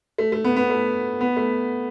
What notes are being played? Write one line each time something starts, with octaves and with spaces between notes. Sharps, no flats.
A3
A3
B3
B3
A3
B3
A3